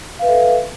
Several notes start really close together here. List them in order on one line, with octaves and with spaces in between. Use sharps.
F5 B4 E5 A4